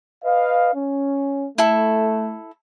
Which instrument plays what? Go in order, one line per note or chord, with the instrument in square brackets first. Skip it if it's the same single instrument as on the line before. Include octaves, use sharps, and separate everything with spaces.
[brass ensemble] B4 D#5 F5
C#4
[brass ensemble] A3 [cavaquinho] E4 A4